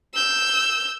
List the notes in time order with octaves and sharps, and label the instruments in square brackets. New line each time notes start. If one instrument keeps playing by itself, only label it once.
[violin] E6 G6